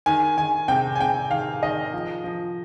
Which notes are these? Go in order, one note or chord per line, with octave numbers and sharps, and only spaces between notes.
D#3 G#5
D#3 G#5
C3 G5
G#5
C3 G5
D#3 F5
D#3 D#5
F3
F3